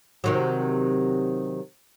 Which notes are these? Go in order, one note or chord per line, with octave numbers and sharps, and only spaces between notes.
C3 D#3 F#3